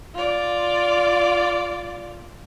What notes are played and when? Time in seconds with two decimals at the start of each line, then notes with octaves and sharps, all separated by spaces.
0.15 F4 D5